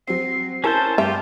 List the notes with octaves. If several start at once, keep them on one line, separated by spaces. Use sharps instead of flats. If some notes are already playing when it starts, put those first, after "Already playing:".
F#3 C4 C7
C#4 E4 A4 A#4 C5 A5
G2 F4 G4 E5